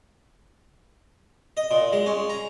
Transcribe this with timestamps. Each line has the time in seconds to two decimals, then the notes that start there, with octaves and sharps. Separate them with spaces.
1.57 D#5
1.71 A#2
1.93 G#3
2.06 C#4
2.30 A#5